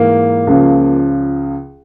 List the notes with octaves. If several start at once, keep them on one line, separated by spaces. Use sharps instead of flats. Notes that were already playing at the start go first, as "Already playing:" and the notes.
Already playing: G#2 E3 A#3
C#2 C#3 F3